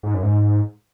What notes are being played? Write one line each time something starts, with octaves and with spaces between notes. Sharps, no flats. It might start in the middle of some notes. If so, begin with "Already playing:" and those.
G#2
F#2
G#2